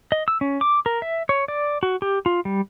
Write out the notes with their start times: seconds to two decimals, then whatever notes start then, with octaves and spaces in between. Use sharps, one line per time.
0.12 D#5
0.28 E6
0.41 C#4
0.61 D6
0.86 A#4
1.02 E5
1.29 C#5
1.48 D5
1.83 F#4
2.02 G4
2.26 F4
2.45 G3